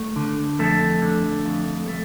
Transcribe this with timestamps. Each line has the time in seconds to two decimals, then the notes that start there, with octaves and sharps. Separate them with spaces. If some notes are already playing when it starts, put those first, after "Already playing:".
Already playing: A3
0.16 D3
0.59 F2 A3 A4
1.02 D3
1.45 F2
1.88 A3